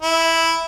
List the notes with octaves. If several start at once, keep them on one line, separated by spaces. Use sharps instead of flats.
E4